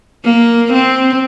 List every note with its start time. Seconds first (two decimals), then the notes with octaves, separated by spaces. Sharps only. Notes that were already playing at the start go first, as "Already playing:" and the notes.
0.24 A#3
0.73 C4